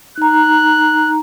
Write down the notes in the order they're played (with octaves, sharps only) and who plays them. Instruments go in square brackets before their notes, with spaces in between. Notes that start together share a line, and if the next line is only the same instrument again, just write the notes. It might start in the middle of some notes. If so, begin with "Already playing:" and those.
[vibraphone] D#4 A#5 [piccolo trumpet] F#6